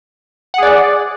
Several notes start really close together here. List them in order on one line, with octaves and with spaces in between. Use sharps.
F#5 G#4 D5